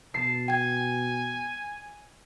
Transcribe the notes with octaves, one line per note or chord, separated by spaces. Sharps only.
B2 A5 C7
G5 G#5 G#6